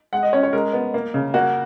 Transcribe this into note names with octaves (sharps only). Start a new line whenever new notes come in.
G#3 F#5
D#5
C#4 C#5
C#5
G#3 A#4
B3
A#3
C#3
A#3 F#4